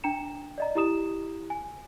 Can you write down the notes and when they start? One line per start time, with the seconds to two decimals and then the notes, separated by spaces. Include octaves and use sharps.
0.04 D4 G5 A#5 C#7 E7
0.58 D5 D#5 A#5
0.75 E4 G4 A#5 D#6 E7
1.50 G#5